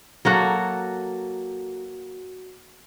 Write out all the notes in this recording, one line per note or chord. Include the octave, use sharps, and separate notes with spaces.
F#3 A#3 F#4 A4